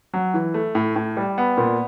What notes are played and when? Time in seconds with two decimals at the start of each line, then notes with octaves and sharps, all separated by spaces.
0.14 F#3
0.34 E3
0.54 A3
0.75 A2
0.96 A2
1.17 G3
1.38 B3
1.57 A#2